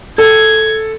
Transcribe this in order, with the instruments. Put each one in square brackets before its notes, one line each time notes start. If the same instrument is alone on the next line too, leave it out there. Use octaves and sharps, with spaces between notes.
[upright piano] A4 [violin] G#6